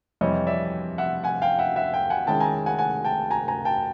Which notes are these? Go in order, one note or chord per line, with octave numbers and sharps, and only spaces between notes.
F2 C3 E3 G3 C#5 D#5
D5 E5
E5 F#5
F#5 G#5
F5 G5
E5 F#5
E5 F#5
F5 G5
F#5 G#5
D#3 G#3 C#4 E4 G5 A5
G#5 A#5
F#5 G#5
F#5 G#5
G5 A5
G#5 A#5
G#5 A#5
G5 A5